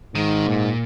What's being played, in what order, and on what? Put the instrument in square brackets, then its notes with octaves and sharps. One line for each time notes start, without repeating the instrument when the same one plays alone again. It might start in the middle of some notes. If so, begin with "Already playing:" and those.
[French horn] G#2 [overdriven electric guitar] D#3
[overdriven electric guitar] A#2